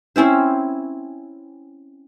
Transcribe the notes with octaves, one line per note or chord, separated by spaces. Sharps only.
C4 C#4 E4 C5